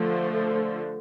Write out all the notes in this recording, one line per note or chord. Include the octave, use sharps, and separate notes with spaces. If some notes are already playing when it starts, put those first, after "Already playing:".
Already playing: D3 F3 A3